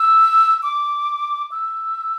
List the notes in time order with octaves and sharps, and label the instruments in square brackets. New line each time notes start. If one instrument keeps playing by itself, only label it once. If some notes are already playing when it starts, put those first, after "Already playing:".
Already playing: [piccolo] E6
D6
E6